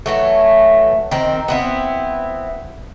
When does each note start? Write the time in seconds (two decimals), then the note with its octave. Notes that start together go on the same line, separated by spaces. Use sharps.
0.06 E3 F#3 A3
1.11 D#3 C4
1.48 B3 C4 E4